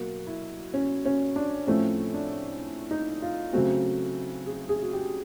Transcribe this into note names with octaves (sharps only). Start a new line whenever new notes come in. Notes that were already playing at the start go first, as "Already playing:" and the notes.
Already playing: B2 F#3 A#3 F#4
E4
C#4
C#4
D4
A2 F3 A3 C4 C#4
D4
D#4
F4
C#3 F#3 A3 C4 F#4
G#4
G#4
F#4
G4